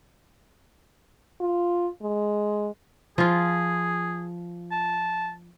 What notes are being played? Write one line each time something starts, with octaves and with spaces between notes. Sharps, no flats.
F4
G#3
F3 F4 G#4
A5